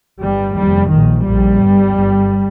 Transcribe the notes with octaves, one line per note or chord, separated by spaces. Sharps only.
G1 G2 G3
F1 D#2 G3
A#1 A#2 D#3
A#1 A#2 G3
G1 G2
G1 G2